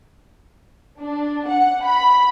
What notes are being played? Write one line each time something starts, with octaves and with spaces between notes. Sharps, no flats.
D4
F#5
B5